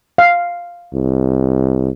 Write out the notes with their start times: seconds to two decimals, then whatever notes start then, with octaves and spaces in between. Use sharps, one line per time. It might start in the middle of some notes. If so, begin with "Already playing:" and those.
0.18 F5
0.94 C2